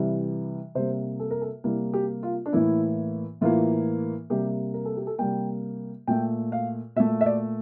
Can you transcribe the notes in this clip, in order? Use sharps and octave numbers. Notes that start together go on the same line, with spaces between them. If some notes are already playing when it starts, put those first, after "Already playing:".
Already playing: C3 E3 G3
C3 G3 A#3 C5
A4
A#4
A4
C3 G3 A#3 E4
G4
F4
D4
A2 E3 A#3 E4
A2 E3 A#3 F4
C3 G3 A#3 G4
A#4
A4
G4
A4
C3 G3 A#3 G5
A#2 A3 G5
F5
A#2 A3 E5
E5
D5